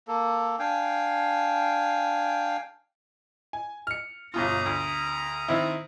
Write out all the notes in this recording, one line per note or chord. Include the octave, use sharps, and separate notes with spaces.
A#3 A4
D4 F5 G5 G#5
G#5
F6 C#7
G1 B2 F4 A#5 D#6
D2
D#3 C4 E4